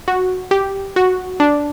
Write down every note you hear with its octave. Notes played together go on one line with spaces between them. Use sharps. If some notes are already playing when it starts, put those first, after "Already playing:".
F#4
G4
F#4
D4